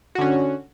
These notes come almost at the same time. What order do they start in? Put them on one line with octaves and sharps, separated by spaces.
F#4 D3 C#4